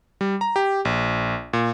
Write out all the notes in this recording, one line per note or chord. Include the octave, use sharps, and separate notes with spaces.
G3
A#5
G4
A#1
A#2